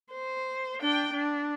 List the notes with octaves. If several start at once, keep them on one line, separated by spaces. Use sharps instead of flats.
C5
D4 G5
D4